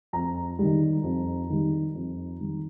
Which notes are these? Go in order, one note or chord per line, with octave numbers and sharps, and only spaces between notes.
F2 A#5
D#3 G3
F2
D#3 G3
F2
D#3 G3